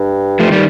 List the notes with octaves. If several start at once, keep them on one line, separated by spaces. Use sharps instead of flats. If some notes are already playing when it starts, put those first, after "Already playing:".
Already playing: G2
F3 A3
D#3 G3